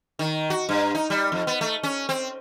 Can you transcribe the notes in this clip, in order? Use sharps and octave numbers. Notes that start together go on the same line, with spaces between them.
D#3
F#4
G2
D#4
G3
F2
B3
A3
C#4
C4